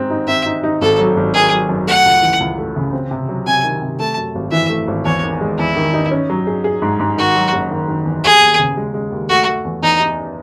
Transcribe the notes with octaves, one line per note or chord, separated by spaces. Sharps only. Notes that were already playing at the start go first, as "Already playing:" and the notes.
Already playing: G#2 C4
D#4
C4 E5
D#4
D#4
G#1 A4
F#3
G#1
D#3 G#4
F#3
F#2
A3 F#5
C#2
E3
C#2
A3
C#3
C4
C3
F#3
C3 G#5
D#3
C3
A3 A5
F#2
G#1
E3 E5
A3
G#1
E2 C#5
D#3
G#3
E2 E4
D#3
D#4
C#4
F#3
G#4
G#4
G#2
G#2
D#3 F#4
F#3
F#1
D#3
D#3
E2
D#2 G#4
D#2
C#3
G#3
G#3
D#2
A3 F#4
A3
E2
E2 D#4
D#4